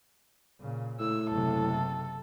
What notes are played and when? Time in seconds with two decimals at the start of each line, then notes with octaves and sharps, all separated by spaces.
0.60 A#2 C#3
1.00 A2 E6
1.30 F#1 C3 A4